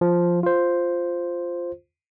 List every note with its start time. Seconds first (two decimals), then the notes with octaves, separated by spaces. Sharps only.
0.01 F3
0.43 F4 C5